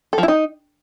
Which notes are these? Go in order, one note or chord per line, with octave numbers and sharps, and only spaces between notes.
A4
F3
E4
D#4